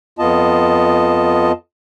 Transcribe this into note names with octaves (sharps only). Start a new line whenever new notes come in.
F2 B3 F4 D#5 A5